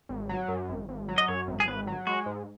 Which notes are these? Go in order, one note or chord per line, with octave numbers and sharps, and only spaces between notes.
G#1
F#3
F#2
G#1
G#1
F#3
D#5
F#2 C#5
G#1
G#4
G#1 B4
F#3
G#3 F#4
G#2